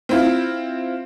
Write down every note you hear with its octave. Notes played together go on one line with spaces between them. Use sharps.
C4 E4 F4